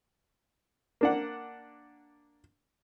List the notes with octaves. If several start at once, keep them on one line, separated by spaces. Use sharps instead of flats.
A#3 D4 F#5